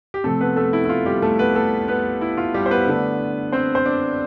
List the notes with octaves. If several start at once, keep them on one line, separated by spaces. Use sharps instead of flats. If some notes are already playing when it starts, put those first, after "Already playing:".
G4
C3 F3 A3 C4 A4
B3 B4
A3 A4
E4
E4
F4
G3 G4
A3 A4
B3 B4
A3 A4
B3 B4
E4
F4
G3 G4
C5
B3 B4
D3 A3 D4
C4 C5
C5
D4 D5